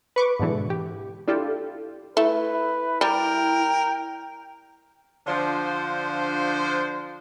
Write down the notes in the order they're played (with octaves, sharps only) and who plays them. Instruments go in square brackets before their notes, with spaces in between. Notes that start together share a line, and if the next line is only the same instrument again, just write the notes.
[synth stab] B4 C#6 D6
G#2 B2 D3 E3
G4
D4 E4 F4 G4 A4
[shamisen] A3 [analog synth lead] E4 [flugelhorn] B4
[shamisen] G3 [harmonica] A#4 [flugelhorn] G5
[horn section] D3 F3 D4 F4 C5